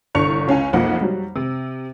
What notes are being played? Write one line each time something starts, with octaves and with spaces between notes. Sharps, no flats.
G1 C2 D4 C#6 C#7 F7
C#2 C#4 F5 G#5
B1 F2 F3 A#3 F#5
F#3 G3
C3